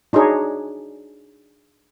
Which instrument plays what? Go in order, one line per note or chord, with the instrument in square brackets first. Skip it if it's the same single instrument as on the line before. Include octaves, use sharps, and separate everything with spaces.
[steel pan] D4 D#4 F#4 G#4 C#5